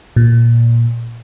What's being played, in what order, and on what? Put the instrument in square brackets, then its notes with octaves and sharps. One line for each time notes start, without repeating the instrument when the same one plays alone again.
[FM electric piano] A#2